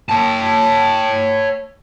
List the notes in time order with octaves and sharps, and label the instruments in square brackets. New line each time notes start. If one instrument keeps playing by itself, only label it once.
[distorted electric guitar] C#5 A5